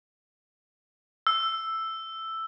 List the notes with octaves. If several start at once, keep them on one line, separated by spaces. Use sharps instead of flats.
E6